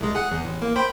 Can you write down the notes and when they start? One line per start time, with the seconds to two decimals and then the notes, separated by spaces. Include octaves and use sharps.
0.01 C2 G#3
0.15 G#4 F#5
0.31 E2
0.44 A1
0.62 A#3
0.76 C5 G5 B5